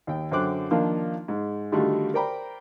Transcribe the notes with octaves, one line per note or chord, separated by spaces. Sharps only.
D#2 G5
F#2 D3 C5 G5 D6 F#6
D#3 F3 A#3 D4 F4
G#2
D3 D#3 G3 A3 F4 F#4
A#4 C5 D5 G5 A#5 B5